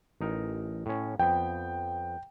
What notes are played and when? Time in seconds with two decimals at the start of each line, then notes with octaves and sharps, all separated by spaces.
0.21 A1 D#4 A#4
0.86 A2 C#4
1.19 F2 B3 G5